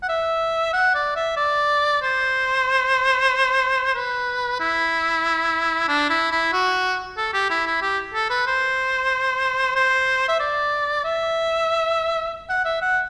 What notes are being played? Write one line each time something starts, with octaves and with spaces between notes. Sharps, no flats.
F#5
E5
F#5
D5
E5
D5
C5
B4
E4
D4
E4
E4
F#4
A4
G4
E4
E4
G4
A4
B4
C5
C5
E5
D5
E5
F#5
E5
F#5